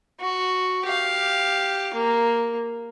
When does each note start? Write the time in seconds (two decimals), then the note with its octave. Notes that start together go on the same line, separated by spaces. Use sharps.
0.20 F#4
0.86 G4 F5
1.94 A#3